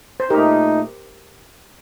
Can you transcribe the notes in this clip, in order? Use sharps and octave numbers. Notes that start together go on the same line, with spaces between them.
C5
A#2 A3 D#4 G4 A#4